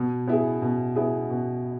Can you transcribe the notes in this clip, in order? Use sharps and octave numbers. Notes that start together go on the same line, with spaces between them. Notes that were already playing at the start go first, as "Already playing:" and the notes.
Already playing: B2
B3 E4 G#4
B2
B3 E4 G#4
B2